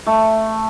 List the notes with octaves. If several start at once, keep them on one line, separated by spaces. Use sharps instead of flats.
A3